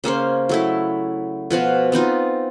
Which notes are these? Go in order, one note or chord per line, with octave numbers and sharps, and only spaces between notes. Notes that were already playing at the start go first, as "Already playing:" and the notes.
C#3 A#3 C#4 C5
F#3 A3 E4
B2 F3 F#4 F5
B3 C4 D#4 F4